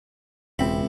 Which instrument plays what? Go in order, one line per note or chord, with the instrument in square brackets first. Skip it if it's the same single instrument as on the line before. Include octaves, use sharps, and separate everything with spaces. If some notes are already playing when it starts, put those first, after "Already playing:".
[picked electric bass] E1 C4 [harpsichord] C#2 E5 B5